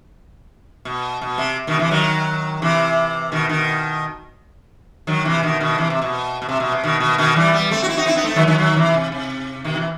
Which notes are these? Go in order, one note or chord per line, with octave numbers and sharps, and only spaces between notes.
B2
B2
C3
B2 D#3
C3 E3
D#3 F#3
C3 E3
B2 D#3
B2 D#3
D#3 F#3
C3 E3
B2 D#3
B2 D#3
C3 E3
C3
B2
B2
C3
B2
C3
B2 D#3
B2 D#3
B2 D#3
E3 G3
G3 B3
A3 C4
F#4
C4 E4
D#4 F#4
C4 E4
B3 D#4
A3 C4
D#3 F#3
D#3 F#3
D#3 F#3
C3 E3
C3
C3
B2 D#3
C3 E3